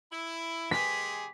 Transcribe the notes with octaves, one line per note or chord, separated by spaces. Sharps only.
E4
G#3 G4 G#4 B6